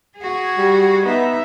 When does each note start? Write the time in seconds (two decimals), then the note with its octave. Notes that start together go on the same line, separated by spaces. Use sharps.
0.18 F#4 G#4
0.59 G3
1.05 B3 D#4 E5